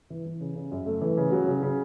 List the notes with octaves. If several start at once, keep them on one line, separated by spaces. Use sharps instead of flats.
E3
E3
C#3
C#3
F#2
A3
E3
C#3
F#3
C#3
C#3